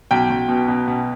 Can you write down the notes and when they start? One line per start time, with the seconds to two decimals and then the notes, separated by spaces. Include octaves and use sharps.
0.11 B1 G5
0.30 B1
0.49 B2
0.68 B2
0.88 B2